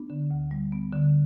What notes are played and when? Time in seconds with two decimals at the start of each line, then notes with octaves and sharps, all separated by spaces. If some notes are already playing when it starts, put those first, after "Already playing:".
Already playing: B3 D4
0.10 D3
0.30 D2
0.51 G3
0.72 B3
0.93 D3